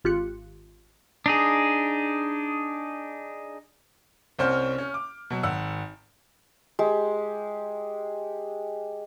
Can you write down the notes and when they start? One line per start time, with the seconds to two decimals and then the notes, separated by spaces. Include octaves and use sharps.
0.04 G#1 F4 G4 F#6 C#7
1.26 D4 D#4 G#4
4.39 C2 C4 C#4 C5 F6 G6
4.78 C#4
4.94 D6
5.30 B2 F#3
5.43 G#1 F#5 E6
6.79 G#3 G4